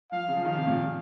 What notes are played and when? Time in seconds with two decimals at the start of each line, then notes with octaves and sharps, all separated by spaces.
0.11 F3 F5
0.28 C#3
0.37 F3
0.45 D#3 F5
0.55 C3
0.67 A#2